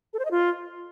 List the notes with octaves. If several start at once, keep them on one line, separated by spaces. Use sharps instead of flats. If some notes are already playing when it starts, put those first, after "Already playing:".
A4
C5
D#5
F4